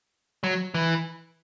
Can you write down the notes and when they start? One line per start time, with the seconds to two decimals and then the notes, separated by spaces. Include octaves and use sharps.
0.44 F#3
0.74 E3